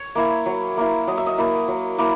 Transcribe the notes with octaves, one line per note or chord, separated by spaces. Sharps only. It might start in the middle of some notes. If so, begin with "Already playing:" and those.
Already playing: C#5
A#3 E4
F#3
A#3 E4
F#3 D#5
E5
D#5
A#3 E4
F#3
A#3 E4